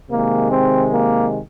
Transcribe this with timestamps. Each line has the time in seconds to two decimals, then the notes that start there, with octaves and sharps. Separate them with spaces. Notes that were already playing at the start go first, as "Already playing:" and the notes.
0.10 C3 D#3 G#3 A#3
0.51 C4
0.91 A#3